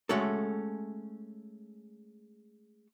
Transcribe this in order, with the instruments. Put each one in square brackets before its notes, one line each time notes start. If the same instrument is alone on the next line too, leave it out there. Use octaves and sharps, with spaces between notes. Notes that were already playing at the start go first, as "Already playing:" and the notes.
[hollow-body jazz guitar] G#3 A3 C#4 F#4 A4